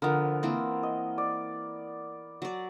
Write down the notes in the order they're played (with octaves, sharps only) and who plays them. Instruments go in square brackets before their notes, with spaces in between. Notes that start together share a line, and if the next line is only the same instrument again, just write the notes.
[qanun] D3 F3 [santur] B3 A#4
[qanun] E3 A#3 C4
[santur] D#5
D5
[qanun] F#3 D5